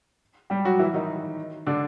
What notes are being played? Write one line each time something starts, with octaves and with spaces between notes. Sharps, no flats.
G3 G4
F#3 F#4
E3 E4
D#3 D#4
D3 D4